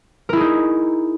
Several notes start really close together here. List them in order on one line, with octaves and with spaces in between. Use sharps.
A#4 E4 G#4 D#4